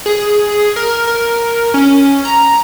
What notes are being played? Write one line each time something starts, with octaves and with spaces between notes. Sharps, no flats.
G#4
A#4
A#4
C#4
A#5